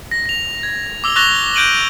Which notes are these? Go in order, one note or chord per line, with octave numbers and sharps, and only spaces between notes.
A#6
A#6 F7
G#6
D6 E6 F7 G7
C#6 F#6 A6 A#6 F7 G7
F#6 G6 D7 D#7 F#7